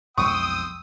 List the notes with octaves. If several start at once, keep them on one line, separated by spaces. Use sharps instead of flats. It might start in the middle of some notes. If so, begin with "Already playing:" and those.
B1 F2 G#3 G5 C6 C#6 D#6 E6